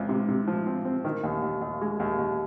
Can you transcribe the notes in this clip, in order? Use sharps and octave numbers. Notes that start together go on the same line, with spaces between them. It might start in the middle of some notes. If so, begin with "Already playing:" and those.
Already playing: C#2 C4
C3
C3
F3
C4
C4
D#3
D#2
D#2
D#2
G#3
D#2
D#2